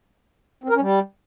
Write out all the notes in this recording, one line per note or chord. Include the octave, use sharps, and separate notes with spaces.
C4
A#4
C#4
G3